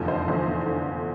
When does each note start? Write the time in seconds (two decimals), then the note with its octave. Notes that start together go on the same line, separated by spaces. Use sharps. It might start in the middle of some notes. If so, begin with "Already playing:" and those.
Already playing: F1 E2 D3 F3
0.08 C5
0.27 F1 E2 D3 F3
0.66 D3